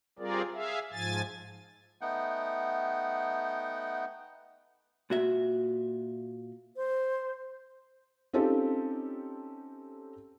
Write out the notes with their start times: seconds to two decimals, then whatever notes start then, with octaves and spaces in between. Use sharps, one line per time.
0.19 G3 C4 F4 G#4 A#4 D5
0.54 G#4 E5 F5
0.93 G#2 F3 G#5 A6
2.01 A3 B3 D#4 F#5 G5
5.10 A#2 F#4 E5
6.76 C5
8.33 C4 C#4 D#4 F4 G4 A4